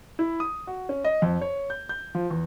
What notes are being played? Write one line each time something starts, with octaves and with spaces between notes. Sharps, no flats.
E4
D#6
F#4
C#4
D#5
F2
C#5
G6
G6
F3
E2